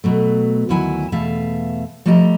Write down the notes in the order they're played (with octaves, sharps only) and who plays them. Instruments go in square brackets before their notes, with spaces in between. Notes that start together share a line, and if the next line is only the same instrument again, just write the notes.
[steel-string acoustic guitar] B2 F#3 A3
D2 D#3 F#3 E4 F#5 G#5
E2 B2 A3 E5 F5 A5
F3 G3 A3 G4 D#5 A#5